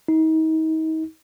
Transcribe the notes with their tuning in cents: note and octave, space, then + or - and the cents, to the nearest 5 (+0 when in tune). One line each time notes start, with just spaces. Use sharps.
D#4 +35